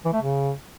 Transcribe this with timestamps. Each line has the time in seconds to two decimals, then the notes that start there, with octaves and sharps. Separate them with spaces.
0.05 E3
0.13 A3
0.21 C#3